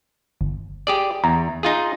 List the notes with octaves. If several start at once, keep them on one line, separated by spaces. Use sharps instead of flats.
G1
G4 G#4 D5
E2 A#5
D#4 F4 G#4